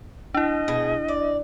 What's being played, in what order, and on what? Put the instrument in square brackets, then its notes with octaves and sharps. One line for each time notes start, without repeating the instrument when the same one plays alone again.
[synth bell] D4 E4 [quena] D#5
[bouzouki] B2 G#4
D5